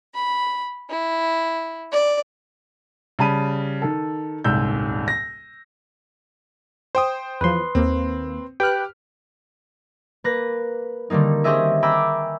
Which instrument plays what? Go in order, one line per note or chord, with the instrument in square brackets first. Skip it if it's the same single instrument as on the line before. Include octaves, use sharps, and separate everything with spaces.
[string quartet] B5
E4
D5
[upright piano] C#3 G3 A5 B5 D#7
D#3 A4
D#1 C2 G#2 E6 G6
A#6
[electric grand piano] C5 G5 D#6
[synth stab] E2 F3 [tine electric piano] B4 C6
[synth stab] D#2 A#3 [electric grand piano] C4
[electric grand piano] G4 F6 [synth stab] B4 F#6 [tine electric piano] G5
[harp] A#3 B4 A#6
D3 D#3 G3 A#3 D#4
C4 C#4 G4 G#4 D#5 E5
G5 G#5 A#5 B5 D6 E6